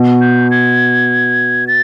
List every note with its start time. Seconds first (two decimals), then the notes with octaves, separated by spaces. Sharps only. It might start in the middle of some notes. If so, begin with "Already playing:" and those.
Already playing: B2
0.21 G6
0.51 G#6
1.67 A6